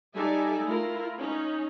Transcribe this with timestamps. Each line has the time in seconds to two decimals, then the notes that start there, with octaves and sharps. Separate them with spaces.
0.15 G3 D#4 A4 D5 E5 G#5
0.66 A3 E4 F4 A#4
1.18 C#4 D#4